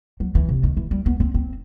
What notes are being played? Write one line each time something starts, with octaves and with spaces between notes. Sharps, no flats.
F#3
E3
C3
D#3
E3
G3
B3
C4
C4